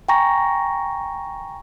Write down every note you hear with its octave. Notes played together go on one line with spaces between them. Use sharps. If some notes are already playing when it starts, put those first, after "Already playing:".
G5 G#5 A#5 C#6 A#6